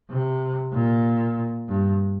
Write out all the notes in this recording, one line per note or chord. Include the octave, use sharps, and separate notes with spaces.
C3
A#2
G2